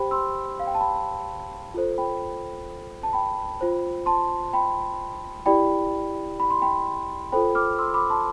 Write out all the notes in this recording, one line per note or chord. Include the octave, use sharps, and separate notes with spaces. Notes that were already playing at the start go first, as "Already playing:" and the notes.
Already playing: G4 C5 G5 B5
C6 E6
F5
G5
A5
G5 B5
F4 A4 C5
G5 B5
A5
G5 B5
F4 C5
A5 C6
G5 B5
E4 G4 D5 G5 B5
B5
C6
G5 B5
F4 A4 C5 G5 B5
D6 F6
C6 E6
B5 D6
A5 C6